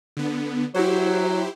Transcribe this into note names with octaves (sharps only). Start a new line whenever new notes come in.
D3 B3
F#3 E4 G4 C5